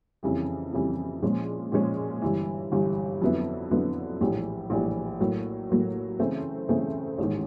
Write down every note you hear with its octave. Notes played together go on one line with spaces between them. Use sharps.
F2 C#3 E3 G3
F2 C#3 E3 G3
A#2 F3 G#3 C#4
A#2 F3 G#3 C#4
G1 G2 E3
G1 G2 E3
F2 D3 F#3 B3 E4
F2 D3 F#3 B3 E4
A#1 A2 E3 G3
A#1 A2 E3 G3
A2 F#3 A#3
A2 F#3 A#3
C#3 E3 A3 C4 E4
C#3 E3 A3 C4 E4
A1 G#2 D#3